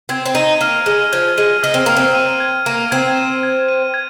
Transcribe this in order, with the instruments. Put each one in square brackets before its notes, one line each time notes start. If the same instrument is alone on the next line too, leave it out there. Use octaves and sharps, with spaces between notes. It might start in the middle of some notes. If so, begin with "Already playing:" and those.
[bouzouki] C4 [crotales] G#6
[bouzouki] C4
[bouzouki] D#4 [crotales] D#7
[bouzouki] A#3 [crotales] F6
[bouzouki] G#3 [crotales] F6
[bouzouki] F3 [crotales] G#6
[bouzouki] G#3 [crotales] D#7
[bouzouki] D#4 [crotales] F6
[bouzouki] C4
[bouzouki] A#3 [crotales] F6
[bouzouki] C4
[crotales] D#7
G#6
[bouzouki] A#3 [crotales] D#7
[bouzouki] C4 [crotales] G#6
[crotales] D#7
G#6
D#7
G#6